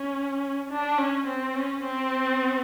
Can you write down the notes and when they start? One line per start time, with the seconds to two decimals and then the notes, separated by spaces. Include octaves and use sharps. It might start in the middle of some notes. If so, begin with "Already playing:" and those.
Already playing: C#4
0.71 D4
0.99 C#4
1.27 C4
1.56 C#4
1.84 C4